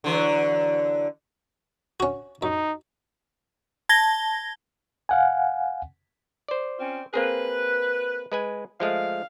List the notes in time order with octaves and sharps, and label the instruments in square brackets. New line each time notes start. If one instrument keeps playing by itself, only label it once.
[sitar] D3 E3 F#3
[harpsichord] C#4 F#4
[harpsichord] F#2 [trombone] D#4
[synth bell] A5 G#6 A#6 G7
[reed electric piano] F5 F#5 G#5
[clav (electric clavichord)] C5 D5
[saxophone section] C4 C#4 F4
[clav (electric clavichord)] A#3 C4 G#4 [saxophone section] B4
[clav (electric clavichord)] G#3 B4 G#5
[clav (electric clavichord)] F3 G#3 A3 [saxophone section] F5